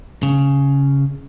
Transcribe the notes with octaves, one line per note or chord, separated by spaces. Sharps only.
C#3